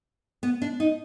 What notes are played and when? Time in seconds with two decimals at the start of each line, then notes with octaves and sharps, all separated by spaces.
0.43 B3
0.62 D4
0.80 D#4